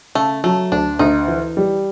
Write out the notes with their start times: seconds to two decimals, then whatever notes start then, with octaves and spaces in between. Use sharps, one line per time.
0.15 C#3 A3
0.44 F#3 A3
0.72 D2 D4
0.99 D2 D#4
1.28 E3
1.57 G3